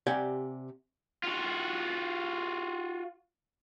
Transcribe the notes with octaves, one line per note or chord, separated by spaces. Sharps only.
C3 G4 D5 F#5 G#5
F4 F#4